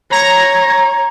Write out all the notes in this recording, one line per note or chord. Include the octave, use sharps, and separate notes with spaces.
C#5 A#5